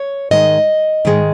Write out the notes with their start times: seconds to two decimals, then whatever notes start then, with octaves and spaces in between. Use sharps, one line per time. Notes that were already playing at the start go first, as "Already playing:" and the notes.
Already playing: C#5
0.31 G#2 D#3 G#3 D#5
1.05 G#2 D#3 G#3